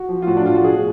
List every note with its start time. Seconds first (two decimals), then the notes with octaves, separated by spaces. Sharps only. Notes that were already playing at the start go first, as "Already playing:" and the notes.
Already playing: F#4
0.09 F3
0.22 F4
0.27 A2 F#4
0.37 D4
0.46 F3 F4
0.55 F#4
0.64 B2 G#4